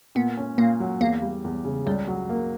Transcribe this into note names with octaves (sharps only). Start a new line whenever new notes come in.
A#2 B3
C#4
A#2 A#3
F#3
E2 A#3
G3
E2
C#3
C#2 G3
F#3
A#3